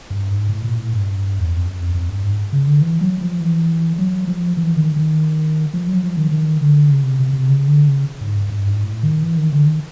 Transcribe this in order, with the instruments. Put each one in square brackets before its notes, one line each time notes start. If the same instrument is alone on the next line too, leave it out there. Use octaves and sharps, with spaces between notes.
[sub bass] G2
G#2
A2
A#2
A2
G2
E2
F2
F#2
F2
F2
G2
G#2
C#3
D3
E3
F#3
F3
E3
F#3
F3
E3
D#3
D#3
F3
F#3
F3
D#3
D#3
D3
C#3
C3
C3
C3
C#3
D3
C#3
G#2
G2
G2
G#2
A2
D#3
E3
D#3
D3
D#3